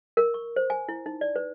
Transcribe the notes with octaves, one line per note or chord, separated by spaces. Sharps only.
A#4
C#6
C5
G#5
E4
D#4
D5
B4